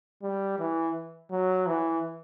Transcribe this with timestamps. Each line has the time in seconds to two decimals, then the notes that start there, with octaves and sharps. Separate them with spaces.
0.23 G3
0.59 E3
1.31 F#3
1.67 E3